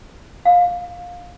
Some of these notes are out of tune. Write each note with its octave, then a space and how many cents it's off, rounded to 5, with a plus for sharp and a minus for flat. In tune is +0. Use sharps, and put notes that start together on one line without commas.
F5 +20